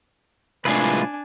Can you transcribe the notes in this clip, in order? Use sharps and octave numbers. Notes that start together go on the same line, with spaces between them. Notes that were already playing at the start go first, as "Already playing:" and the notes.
C2 A2 G#3 D4 F4 B4 G#5